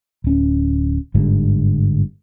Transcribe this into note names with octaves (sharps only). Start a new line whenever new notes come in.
D1 C#4
G1 G#2 D3 G3